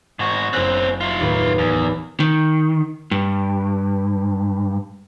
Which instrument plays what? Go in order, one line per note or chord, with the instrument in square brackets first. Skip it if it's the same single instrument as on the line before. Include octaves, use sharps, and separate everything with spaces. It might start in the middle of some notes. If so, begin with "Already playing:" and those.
[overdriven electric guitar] G#2 F#4
[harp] F#1 F#6 [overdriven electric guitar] C4 C#4
[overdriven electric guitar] F4 E5
[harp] D#2 A2 B3
[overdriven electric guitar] E2
[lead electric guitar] D#3
G2